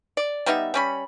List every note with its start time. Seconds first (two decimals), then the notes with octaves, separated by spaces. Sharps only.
0.17 D5
0.46 G3 B3 D#4 E5
0.74 G3 C#4 B5